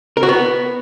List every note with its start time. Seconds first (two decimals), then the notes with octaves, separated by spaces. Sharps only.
0.17 A#4
0.23 F#4
0.28 B3